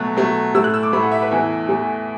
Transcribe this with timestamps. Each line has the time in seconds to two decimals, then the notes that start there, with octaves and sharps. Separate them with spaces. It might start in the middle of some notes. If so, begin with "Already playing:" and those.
Already playing: B2 F#3 A3 F#6
0.16 B2 F#3 A3
0.54 A2 A3 E6
0.64 F#6
0.74 E6
0.83 D6
0.93 A2 A3 B5
1.03 F#5
1.11 E5
1.22 B4
1.31 E2 E3 A3 E5
1.69 E2 E3 A3